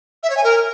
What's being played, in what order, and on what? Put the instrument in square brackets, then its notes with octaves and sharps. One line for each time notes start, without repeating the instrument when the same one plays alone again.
[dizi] E5
C#5
G#5
A#4